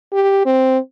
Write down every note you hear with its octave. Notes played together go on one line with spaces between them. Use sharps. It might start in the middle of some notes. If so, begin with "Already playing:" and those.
G4
C4